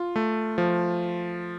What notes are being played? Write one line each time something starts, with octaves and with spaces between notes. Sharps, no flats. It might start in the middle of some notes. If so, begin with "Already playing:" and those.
Already playing: F4
A3
F3